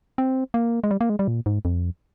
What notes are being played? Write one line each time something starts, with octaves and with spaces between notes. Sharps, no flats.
C4
A#3
G#3
G3
A#3
G#3
G3
A#2
G#2
F2